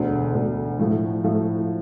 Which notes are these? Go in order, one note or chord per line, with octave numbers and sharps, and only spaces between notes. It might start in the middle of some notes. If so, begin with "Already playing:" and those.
Already playing: E1 D2 D3
E1 D2 D3
A2 F3 A3
A2 F3 A3